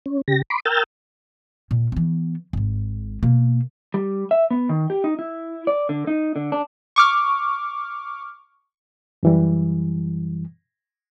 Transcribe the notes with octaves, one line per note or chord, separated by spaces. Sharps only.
C#4
C#3 G4 A#6
B5 C6 D6
A#4 G5 E6 F6 G6 A6
A#2
E3 B3
G#1 G#2
B2 A#3
G3
E5
B3
D#3
G4
D#4
E4
D5
D3
D#4
D3
D4
C#6 D6 F6
F#2 E3 G3